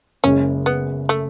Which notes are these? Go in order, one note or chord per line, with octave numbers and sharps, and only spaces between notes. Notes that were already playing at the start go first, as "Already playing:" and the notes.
F#1 F#2 C#3 G#3 C#4
B3
A3